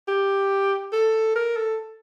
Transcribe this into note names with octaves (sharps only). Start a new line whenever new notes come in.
G4
A4
A#4
A4